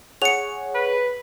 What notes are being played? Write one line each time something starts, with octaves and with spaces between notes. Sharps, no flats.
G#4 C#5 F#5 C#7 F7
B4